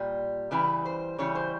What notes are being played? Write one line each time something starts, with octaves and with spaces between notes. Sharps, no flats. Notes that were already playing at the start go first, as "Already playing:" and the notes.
Already playing: A#2 G3
C#3 E3 G3 B4
C5
C#3 E3 G3 C#5
C5